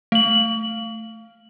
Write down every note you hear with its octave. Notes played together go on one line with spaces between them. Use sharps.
A3 F#7